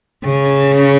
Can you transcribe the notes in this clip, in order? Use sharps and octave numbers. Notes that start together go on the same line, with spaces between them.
C#3